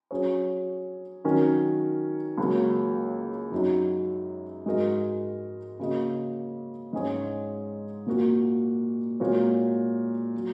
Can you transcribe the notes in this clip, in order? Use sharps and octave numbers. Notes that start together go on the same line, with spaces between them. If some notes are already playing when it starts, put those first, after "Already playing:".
F#3 C#4 G#4 C#5
D#3 F#3 C#4 F#4 A#4
C#2 C#3 F#3 A#3
F#2 F#3 D#4
G#2 G#3 F#4 A#4 D#5
C#3 A#3 F#4 D#5
G#2 G#3 C#4 G#4 C#5
A#2 A#3 F#4
A#2 G#3 F#4 A#4 C#5
F#3